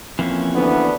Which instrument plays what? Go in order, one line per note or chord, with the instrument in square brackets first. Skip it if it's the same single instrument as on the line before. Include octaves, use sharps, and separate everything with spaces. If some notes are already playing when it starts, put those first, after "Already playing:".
[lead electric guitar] F2 [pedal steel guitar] E3 A#3 C#4
[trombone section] D2 B3 [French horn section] D4 E4